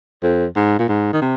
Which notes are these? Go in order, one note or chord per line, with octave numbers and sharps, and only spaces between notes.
F2
G#2
A#2
G#2
D#3
C3